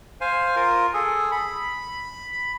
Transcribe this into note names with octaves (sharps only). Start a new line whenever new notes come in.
C5 F5 G#5
F4 A#4
G#4 A4
B5